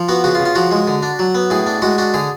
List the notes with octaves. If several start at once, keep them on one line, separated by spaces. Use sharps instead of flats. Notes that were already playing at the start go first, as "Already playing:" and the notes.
Already playing: F3
B3 F#4
C#3 F#4
F4
C#3
F4
F3 F#4
G#3
D3
D4
F#3
B3
A2 G#4
D4
G#3 F#4
D4 F#4
D3 G#4